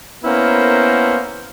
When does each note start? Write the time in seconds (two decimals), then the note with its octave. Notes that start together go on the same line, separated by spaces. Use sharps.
0.24 A#3 B3 C#4 E4 A#4 C5